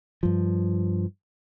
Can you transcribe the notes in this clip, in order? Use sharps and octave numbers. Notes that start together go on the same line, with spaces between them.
G2 F3